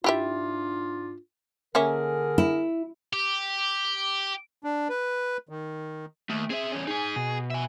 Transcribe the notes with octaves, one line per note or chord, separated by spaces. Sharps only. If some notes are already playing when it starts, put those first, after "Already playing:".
G#2 D4 E4 F4 G4 E5
D3 A#3 C#4 G#4 A#4 E5
E4
G4
D4
B4
D#3
D#2 A3
C4 G#4 E5
E2 C#4
D#4 G#4 G#5
B2
E5 G#5